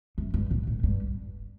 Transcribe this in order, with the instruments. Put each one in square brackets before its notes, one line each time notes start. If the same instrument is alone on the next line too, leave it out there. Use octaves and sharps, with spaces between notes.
[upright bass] F#2
G2
A2
A2
G2